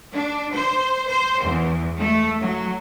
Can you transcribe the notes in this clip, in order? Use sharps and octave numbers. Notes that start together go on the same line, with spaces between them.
D4
C5
C5
E2
A3
F#3